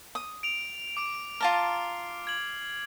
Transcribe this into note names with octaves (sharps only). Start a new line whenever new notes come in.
D#6
D7 F7
D6 D7
F4 A5 A#5 F6 C7
G#6 F#7